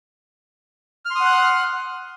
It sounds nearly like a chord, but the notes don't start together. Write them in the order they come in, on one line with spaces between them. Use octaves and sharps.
F6 C6 D#6 F#5 F#6